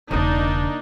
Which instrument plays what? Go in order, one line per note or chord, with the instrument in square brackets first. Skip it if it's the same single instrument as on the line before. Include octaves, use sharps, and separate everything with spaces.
[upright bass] E1 C#3 [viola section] A#3 D4 D#4